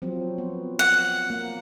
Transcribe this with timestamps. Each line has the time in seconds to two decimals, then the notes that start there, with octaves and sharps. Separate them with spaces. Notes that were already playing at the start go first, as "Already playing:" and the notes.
0.02 F3 F#3 C4
0.38 B3
0.79 F#5
1.30 A#3